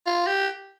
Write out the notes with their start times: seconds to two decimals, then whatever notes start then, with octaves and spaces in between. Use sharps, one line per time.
0.06 F4
0.27 G4